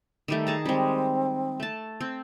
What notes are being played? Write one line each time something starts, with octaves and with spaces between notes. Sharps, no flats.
D#3 G3 A3
G#4 A5 A#5
G3 G#3 C4
A3 A5
C4